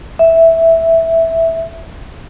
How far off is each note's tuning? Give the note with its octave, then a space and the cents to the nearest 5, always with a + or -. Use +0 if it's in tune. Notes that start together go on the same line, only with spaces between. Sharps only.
E5 -5